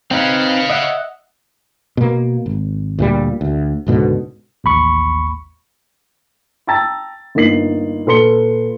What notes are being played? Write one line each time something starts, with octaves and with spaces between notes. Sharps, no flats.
C4 D#4 B4 C#5 F5
D#5 E5 F#5
B2 A#3
G#1
D2 A#2 G3
D2
C#2 G#2 B2 D3
A1 D#2 B5 C#6
G5 A5 A#5 E6 A6
G1 A#3 D#4 C7 F#7
A#2 A4 B4 C6 C#7 G7